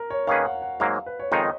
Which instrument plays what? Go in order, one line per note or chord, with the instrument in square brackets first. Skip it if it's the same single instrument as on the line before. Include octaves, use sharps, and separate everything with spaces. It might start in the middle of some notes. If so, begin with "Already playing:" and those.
Already playing: [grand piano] A#4
C#5
[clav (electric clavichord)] D#3 A#3 C#4 G#4 B4 [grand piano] F5
[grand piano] F#5
F#5
[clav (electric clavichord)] G#2 F#3 A#3 [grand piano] F5
[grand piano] B4
C#5
[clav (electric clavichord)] F2 D#3 G#3 D#4 [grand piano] D#5